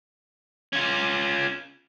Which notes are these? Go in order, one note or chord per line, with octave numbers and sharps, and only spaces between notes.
C#4 F4